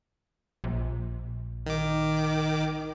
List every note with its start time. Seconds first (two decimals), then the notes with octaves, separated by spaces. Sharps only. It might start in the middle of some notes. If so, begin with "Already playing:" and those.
0.64 A#1
1.66 D#3 D6